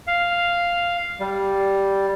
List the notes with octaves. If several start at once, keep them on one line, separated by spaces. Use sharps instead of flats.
F5
G3